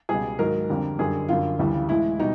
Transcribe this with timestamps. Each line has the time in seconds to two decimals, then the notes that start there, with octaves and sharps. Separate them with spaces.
0.09 C#2 B2 G3 G#4
0.39 G#2 D#3 F#3 A#4
0.69 F2 D3 G3
0.99 F#2 D3 G3 G#4
1.29 F#2 D3 G3 F4
1.59 D2 C#3 E3 G3
1.89 A2 E3 G#3 E4
2.19 B2 G3 D#4